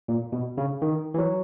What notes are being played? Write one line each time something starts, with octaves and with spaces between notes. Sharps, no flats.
A#2
B2
C#3
D#3
E3
F#3